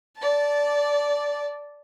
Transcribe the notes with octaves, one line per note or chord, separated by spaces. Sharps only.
D5 A5